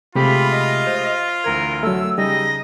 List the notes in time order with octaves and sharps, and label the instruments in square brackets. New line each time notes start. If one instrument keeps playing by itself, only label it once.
[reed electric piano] C3 [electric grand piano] G#3 A3 G4 [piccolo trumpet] F4 [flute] B5
[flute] D#5
[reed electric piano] C5
[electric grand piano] D2 E3 G#6 [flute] A#4
[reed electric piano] F#3 A3 [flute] E6
[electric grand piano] C#3 D#4 [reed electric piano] G3 [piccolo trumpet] D#5 [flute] A#6